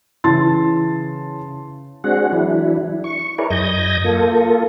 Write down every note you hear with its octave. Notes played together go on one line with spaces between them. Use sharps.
C#3 E3 E4 A5 C6 A6
G#3 C4 D4 F#4 G#4 F#5
E3 F#3 D4 E4
C#6
E4 G#4 A#4 B4 C#5 D5
F#2 D#5 D#6 G6 G#6 A#6
A#3 F4 A4